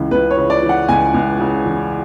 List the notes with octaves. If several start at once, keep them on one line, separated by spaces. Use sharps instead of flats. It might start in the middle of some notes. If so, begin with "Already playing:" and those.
Already playing: C#2 C#3 E3
C#2 B4
C#5
C#3
D5
E3
F#5
C#2 G#5
C#2
C#3
E3